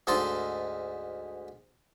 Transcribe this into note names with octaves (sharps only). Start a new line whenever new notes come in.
D2 G#2 D#4 A4 A5 C6